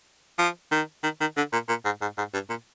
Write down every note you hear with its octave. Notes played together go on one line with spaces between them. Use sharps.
F3
D#3
D#3
D#3
D3
A#2
A#2
G#2
G#2
G#2
G2
A#2